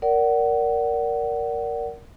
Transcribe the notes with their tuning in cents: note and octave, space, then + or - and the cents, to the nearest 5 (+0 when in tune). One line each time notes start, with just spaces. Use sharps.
A#4 +0 D5 -20 F#5 +25